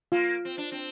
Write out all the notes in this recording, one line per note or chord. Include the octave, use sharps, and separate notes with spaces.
A#3 F4
C4
D4
C4